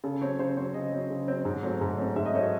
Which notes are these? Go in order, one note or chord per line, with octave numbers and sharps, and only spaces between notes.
C#3 A4
F#3 C4 C#5
C#3 C5
F#3 C4 C#5
C#3 D#5
F#3 C4
C#3
F#3 C4
G#2
F#3 A3 C4
G#2
F#3 A3 C4
G#2 E5
D#5
F#3 A3 C4 C#5